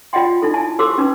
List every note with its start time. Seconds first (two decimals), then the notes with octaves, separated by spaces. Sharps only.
0.13 F4 D5 D#5 F#5 G5 C6
0.42 D#4 E4 A4
0.54 E4 G#5 A5
0.79 G4 A4 C5 C6 D6 E6
0.98 C#4 D#4 B4